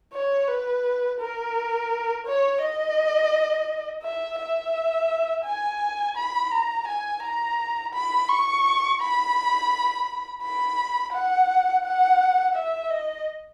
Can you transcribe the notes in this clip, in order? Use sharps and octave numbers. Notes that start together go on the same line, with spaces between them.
C#5
B4
A#4
C#5
D#5
E5
E5
G#5
B5
A#5
G#5
A#5
B5
C#6
B5
B5
F#5
F#5
E5
D#5